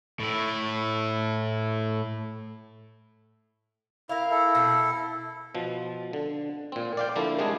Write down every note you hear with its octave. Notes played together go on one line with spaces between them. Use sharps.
A2 E4
E4 A#4 F5
E4 A4
B2 C4
B2 F3
D3
A#2 C4
D5 F5 G5
D3 F3 A#3 E4
C3 G3 G#3 D4 G#4